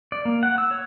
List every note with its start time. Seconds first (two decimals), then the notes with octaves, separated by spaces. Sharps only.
0.12 D5
0.25 A#3
0.43 F#5
0.58 E6
0.71 C#5